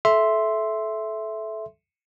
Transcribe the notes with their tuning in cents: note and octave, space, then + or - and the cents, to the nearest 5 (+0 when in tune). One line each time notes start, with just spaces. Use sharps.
A4 -25 E5 +0 C6 +0